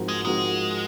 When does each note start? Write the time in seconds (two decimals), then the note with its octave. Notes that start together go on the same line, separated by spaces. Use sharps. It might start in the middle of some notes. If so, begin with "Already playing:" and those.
Already playing: G#2 F3 C4 F#4 A#4
0.08 G#3
0.25 G#2 F3 G#3 C4 F#4 A#4